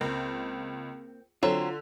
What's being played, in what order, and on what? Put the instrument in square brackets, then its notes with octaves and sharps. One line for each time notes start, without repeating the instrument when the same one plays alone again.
[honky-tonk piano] C#2 [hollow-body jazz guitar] A#3 C4
[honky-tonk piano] D3 [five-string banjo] F#3 C4 [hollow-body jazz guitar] F4